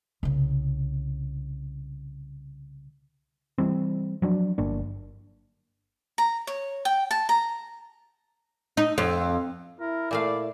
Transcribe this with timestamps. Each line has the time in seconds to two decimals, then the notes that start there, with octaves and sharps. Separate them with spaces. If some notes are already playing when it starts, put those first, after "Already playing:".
0.23 C2 C#3
3.58 E3 G3 C4
4.22 F3 F#3 D4
4.58 G1 A#3 D4
6.18 A#5
6.47 C#5
6.85 G5
7.11 A5
7.29 A#5
8.77 D#4
8.98 F2
9.80 E4 A#4
10.11 A#2 A3 D5 F5